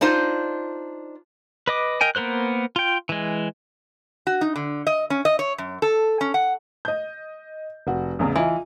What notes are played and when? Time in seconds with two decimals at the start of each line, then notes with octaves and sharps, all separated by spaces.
0.01 D4 D#4 F4 C5
1.68 B4 D#5 D6
2.01 A#4 D#5 G5 G#5
2.15 A#3 B3 A#4 C5 F#6
2.76 F4 G5
3.09 E3 G#3
4.27 F#4
4.41 D#4
4.56 D3
4.87 D#5
5.10 C#4
5.25 D#5
5.39 C#5
5.58 F#2
5.82 A4
6.21 C#4
6.34 F#5
6.85 D#5 G6
7.87 F1 F#4
8.19 A1 E2 C#3
8.36 E3 F4 D#5